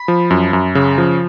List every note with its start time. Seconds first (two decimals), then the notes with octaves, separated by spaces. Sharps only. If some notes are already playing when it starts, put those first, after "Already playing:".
Already playing: B5
0.08 F3
0.30 F#2
0.53 F#2
0.75 C#3
0.98 F3